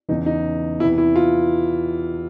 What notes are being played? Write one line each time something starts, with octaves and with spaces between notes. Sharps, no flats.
E2 C#3 E3 D#4
D#4
E2 C3 E3 E4
E4
F4